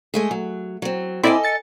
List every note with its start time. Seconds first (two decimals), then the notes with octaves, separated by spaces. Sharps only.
0.14 G#3 A3 G#4
0.31 F#3
0.82 F#3 C4
1.23 C4 E4 A4 D5 D#5 G#5
1.43 A6 C#7